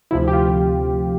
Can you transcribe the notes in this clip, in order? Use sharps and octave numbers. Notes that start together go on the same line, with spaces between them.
D2 C3 F3 E4
G4
F4